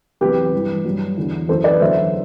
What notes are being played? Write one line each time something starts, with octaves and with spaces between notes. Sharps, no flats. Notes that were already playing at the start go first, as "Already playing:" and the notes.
E2 C3 F#3 G4 B4
G2 E3
G2 F#3
E2 D3 F#3
F#2 E3 A4 C5
B4 D5
E2 D3 F#3 C5 E5